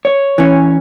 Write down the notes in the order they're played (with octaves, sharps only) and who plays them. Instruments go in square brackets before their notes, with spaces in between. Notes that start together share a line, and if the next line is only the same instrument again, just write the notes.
[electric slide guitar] C#5
[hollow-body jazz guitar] E3 C#4